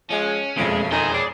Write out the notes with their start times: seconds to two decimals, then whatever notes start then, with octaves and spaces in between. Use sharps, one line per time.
0.10 F3 G#3 C#4
0.57 E1 F2 C#3 F3 G#3 A3 D7
0.92 D#3 A3 D#4 G#4 C#5 C6
1.14 G#4 D5